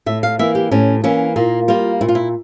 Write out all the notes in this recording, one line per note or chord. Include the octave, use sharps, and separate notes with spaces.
A2 E5
F5
E3 A#3 E5
G4
A2 C#4
E3 A#3 C#4
A#2 A#3
G3 A#3 F4
A#2 E4
F4
E4